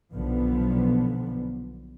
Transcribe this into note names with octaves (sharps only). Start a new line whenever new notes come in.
B1 A#2 D3 F3 B3